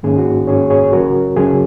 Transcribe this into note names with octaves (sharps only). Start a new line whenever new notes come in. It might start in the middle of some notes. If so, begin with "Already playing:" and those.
G#2 D#3 A#3 C#4 G#4
F#4
G#2 D#3 A#3 C#4 G#4 C#5
G#4 C#5
C#3 F#3 C#4 F#4 A#4
C#3 F#3 C#4 G#4